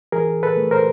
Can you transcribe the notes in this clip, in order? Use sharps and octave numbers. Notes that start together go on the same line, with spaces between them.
E3 G#4 A#4
A4 B4
A3
A#4 C5